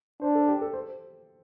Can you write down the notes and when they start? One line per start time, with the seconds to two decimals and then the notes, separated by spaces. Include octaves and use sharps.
0.22 D4 C5
0.35 A4
0.48 G4
0.61 A4
0.74 C5